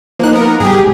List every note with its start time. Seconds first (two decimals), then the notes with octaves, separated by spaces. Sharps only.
0.19 F3 A#3 D#4 F#6
0.32 B3 A#4
0.60 G#2 G3 G4 G#4
0.78 B1 G#3